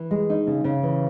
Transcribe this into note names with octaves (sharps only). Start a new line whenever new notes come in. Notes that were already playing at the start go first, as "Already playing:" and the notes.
Already playing: E3
G#3
D#4
C#3
C#3
E3